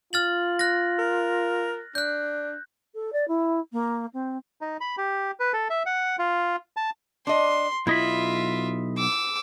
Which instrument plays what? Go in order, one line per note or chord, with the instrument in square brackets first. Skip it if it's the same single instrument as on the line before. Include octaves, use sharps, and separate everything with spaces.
[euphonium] F4 [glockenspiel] F6 A6 F#7
[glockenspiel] F#6 A#6
[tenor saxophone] A#4
[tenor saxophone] D4 [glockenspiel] F#6 G6
[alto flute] A4
D5
E4
A#3
C4
[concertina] D#4
B5
G4
B4
A4
E5
F#5
F4
A5
[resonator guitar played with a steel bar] D4 D#5 [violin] C6
[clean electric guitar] B1 D#5 B5 [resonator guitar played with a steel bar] E4 [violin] F4 E5
[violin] D6 E6